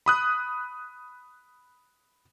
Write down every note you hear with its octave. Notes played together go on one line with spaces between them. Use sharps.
B5 D#6 F#6